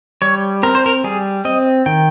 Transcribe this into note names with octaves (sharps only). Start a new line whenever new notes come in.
G3 C#5
C4 A#4
C5
A#4
G3 G#4
C4 D#5
D#3 G5